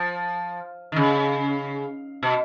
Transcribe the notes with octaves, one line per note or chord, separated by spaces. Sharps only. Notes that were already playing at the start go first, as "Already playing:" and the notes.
Already playing: F3
D#3
C#3
B2